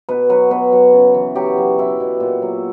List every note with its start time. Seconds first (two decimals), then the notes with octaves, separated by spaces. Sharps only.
0.09 B2 B4
0.29 F#3 B4
0.51 B2 B4
0.72 F#3
0.93 C#3
1.14 E3
1.35 F#3 G4
1.57 F#3
1.78 B2 E4
2.00 B2
2.20 A#2
2.42 F#3